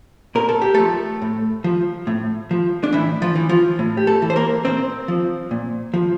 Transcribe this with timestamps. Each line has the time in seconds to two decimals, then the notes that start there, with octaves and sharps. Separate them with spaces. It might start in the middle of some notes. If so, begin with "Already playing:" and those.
0.35 A#2 A#4
0.49 A4
0.62 G4
0.74 F3 A3 A4
1.22 A2
1.64 F3
2.07 A2
2.51 F3
2.84 D4
2.93 A2 E3 E4
3.22 F3 F4
3.35 E3
3.49 F3 F4
3.79 A2
3.97 G4
4.07 A3 A4
4.22 E3
4.30 C5
4.36 A#3 A#4
4.65 A#2 C4 C5
5.08 F3
5.51 A#2
5.94 F3